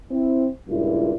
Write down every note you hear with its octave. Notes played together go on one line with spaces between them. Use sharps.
C4 E4
C#2 G2 A#2 E4